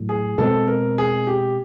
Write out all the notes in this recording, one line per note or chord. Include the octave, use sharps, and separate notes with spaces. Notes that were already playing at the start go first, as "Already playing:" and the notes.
Already playing: A2 F#3
G#4
B2 G#3 C4 A4
A#4
G#4
G4